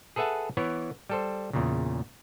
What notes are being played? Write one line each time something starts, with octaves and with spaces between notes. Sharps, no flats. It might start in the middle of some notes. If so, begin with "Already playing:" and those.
G#4 A4 B4 E5 F#5 A5
E3 B3 E4 C#5
G3 A4 C5
E2 A#2 C#3